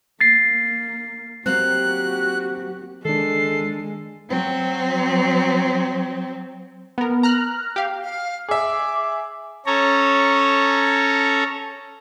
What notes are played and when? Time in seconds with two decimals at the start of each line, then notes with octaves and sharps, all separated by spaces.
0.21 A#3 A6 C7
1.46 F#3 A#3 C4 F#4 G4 F#6
3.05 D#3 G#3 D4 A4 C7
4.28 F#3 C4
6.98 B3 A#4
7.23 A#5 F6 F#6
7.76 G4 F5
8.03 F5
8.49 G#4 E5 D6
9.66 C#4 A4 C#5 A#5